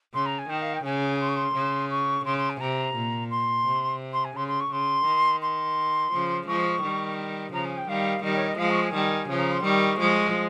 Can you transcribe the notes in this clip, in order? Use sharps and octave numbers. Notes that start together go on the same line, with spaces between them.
C#3 C6
A#5
G#5
D#3 G5
F5
G5
C#3 G#5
C6
C#6
C6
C#3
C#6
C#3 C6
C6
G#5
C3 A#5
A#2
C6
C3
C6
G#5
C#3 C6
C6
C#6
C#3 C6
D#3
C6
C#3 F3
F3 G#3 C#6
D#3 G3
C#3 F3 A#5
G#5
G5
D#3 G3 F5
D#3 G3 D#5
C#5
D#5
F3 G#3 F5
C#6
G#5
D#3 G3
C#3 F3
A#5
C6
D#3 G3 C#6
F3 G#3